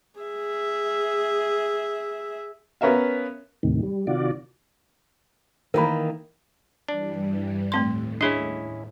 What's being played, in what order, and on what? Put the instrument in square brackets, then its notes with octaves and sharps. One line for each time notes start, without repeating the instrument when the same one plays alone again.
[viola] G#4 E5
[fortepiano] B3 C#4 A#4 E5 F5
[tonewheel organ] D#2 A2 C3 D#3
G3
C3 D#3 F4 F#4 D5
[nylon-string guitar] D#3 E3 A#3 [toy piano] A#4 B5
[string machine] G2 E3 G3 [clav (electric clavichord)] D4
[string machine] D#2 A2 [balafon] A3 C4 C6
[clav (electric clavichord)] C#4 E4 D#5 [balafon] D4 G#4